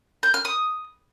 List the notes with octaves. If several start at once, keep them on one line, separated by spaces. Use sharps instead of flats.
G6
F6
D#6